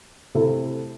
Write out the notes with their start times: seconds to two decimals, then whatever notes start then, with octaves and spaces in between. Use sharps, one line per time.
0.35 C3 A3 E4 A4